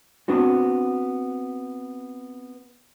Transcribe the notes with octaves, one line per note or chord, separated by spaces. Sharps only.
B3 C4 D4 F#4